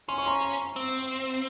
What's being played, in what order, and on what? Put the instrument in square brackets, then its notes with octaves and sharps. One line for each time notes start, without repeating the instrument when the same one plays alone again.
[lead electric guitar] C#4 [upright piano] C6
[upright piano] C#6
A#5 C6
[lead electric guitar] C4